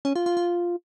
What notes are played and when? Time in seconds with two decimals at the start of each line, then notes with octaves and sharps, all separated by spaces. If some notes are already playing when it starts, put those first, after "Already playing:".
0.05 C#4
0.16 F4
0.26 F4
0.37 F4